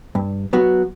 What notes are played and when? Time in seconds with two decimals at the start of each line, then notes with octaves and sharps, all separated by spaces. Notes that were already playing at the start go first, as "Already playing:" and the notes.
0.15 G2
0.53 F#3 B3 F#4